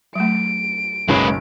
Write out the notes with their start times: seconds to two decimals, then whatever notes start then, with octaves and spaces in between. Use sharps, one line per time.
0.15 F#3 A3 D7
1.09 F#1 B1 G#3 C#4 B4